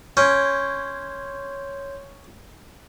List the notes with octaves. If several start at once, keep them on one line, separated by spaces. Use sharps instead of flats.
C#4 C#5 C6 G6